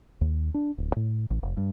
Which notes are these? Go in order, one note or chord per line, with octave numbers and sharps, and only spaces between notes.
D#2
D4
D1
A2
A1
F1
G2